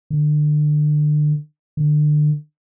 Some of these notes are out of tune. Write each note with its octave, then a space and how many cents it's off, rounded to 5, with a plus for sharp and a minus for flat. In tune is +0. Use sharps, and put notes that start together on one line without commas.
D3 +30
D3 +30